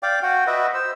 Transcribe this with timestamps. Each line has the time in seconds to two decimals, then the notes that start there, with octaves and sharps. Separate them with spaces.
0.03 D5 F5 G5 D6
0.23 F#4 F#5 G5
0.47 F#4 B4 D#5 E5
0.74 C5 E6